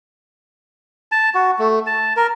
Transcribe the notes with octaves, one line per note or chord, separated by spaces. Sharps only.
A5
F#4
A3
A5
A#4